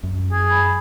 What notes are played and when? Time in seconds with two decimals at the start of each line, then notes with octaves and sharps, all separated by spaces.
0.03 F#2
0.32 G#4
0.51 B5